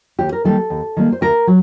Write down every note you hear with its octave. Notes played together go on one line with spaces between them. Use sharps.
D#2 G4
A#4
D#3 G3 A#3 A4
D#2
D#3 G3 A#3
C5
D2 A#4
F#3